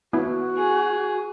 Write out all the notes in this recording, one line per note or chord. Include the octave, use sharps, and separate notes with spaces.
B3 E4 F#4
G#4